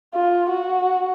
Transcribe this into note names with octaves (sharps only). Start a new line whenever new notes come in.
F4
F#4